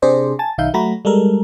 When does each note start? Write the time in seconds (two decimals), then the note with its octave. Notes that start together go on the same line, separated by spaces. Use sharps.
0.02 C3 C4 D4 G#4 C5 D5
0.39 G#5 A5 A6
0.58 B1 D#3 D#4 E5 F5 G6
0.74 F#3 A3 F#4 A#5 B5 A#6
1.05 G3 G#3 A4 A#4